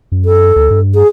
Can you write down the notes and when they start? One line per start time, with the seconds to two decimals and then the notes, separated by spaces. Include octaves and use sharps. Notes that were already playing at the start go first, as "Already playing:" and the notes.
0.12 F#2
0.25 A4
0.56 D2
0.71 G2
0.94 G#4